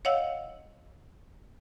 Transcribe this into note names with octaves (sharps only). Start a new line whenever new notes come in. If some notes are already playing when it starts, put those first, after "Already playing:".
C#5 D#5 F5 F#5 E6